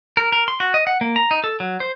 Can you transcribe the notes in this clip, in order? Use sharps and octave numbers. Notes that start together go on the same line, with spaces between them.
A#4
A#4
C6
F#4
D#5
F#5
A#3
A#5
D#4
A4
F#3
C5